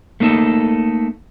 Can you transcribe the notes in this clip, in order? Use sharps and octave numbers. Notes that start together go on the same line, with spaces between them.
A3 A#3 D#4 A4